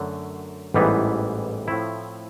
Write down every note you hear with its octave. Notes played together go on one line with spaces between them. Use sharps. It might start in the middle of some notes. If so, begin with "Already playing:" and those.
Already playing: F#2 D3 F#3 A3 D4
A1 G#2 E3 G3 B3
A2 F3 A3 C4 E4